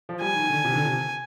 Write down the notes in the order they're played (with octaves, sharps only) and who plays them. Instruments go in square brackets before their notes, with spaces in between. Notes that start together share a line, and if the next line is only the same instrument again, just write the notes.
[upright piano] F3
[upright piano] G3 [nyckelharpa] G#5
[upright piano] D#3
D3
C3
D#3
D3
C3